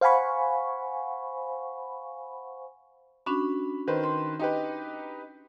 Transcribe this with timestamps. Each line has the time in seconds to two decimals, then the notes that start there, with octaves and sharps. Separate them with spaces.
0.01 C5 F5 F#5 G#5 B5 C#6
3.26 C#4 D4 F#4 B5
3.87 D#3 B4 C5
4.04 C6
4.39 D#4 G4 B4